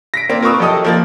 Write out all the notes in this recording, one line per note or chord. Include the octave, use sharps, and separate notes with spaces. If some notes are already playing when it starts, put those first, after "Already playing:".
A#6 B6 D7
A#3 C4 D5 D7
F4 A#4 B4 C#6 D#6 E6
F#2 G4 A4 D#5 D#6
F3 A#3 A6